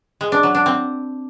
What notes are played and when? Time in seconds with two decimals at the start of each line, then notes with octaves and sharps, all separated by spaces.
0.21 G#3
0.32 D4
0.43 F#3
0.55 D4
0.66 C4